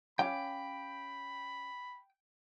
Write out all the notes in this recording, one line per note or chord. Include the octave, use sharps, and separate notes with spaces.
C#4 G4 F5 G5 B5